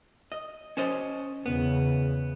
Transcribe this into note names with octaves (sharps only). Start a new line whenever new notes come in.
D#5
C#4 C5 D#5
E2 C#3 B3